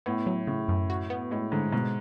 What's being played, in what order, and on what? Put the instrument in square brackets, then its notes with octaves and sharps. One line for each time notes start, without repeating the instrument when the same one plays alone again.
[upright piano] A2 [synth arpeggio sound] B3
[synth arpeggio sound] F#3
[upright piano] A2 [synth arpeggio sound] C#3
[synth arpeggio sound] F#2
F#4
B3
[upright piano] A2 [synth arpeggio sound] G#3
[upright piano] G#2 [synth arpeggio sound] D3
[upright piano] G#2 [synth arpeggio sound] B2